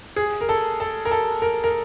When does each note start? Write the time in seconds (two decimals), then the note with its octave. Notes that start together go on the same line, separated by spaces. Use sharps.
0.16 G#4
0.41 A#4
0.49 A4
0.80 A4
1.05 A#4
1.11 A4
1.42 A#4
1.64 A#4